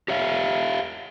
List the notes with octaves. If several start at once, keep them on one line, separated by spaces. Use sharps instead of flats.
G4 C#5 E5 F5